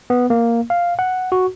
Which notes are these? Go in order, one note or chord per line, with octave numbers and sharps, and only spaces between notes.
B3
A#3
F5
F#5
F#4